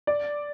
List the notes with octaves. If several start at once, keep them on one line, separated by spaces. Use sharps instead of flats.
D5